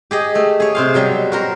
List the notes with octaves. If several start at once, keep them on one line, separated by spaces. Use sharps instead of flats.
G4 G#4 D#5
A3
G#4 C#5
C3 C5 F5
B2 F#3 G3
F#4 A#4 C5